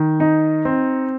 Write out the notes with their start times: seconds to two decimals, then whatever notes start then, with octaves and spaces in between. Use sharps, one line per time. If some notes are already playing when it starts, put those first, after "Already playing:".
Already playing: D#3
0.20 D#4
0.65 C4